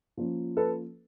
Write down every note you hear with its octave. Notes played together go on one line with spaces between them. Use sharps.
F3 A#3 C#4
A4 B4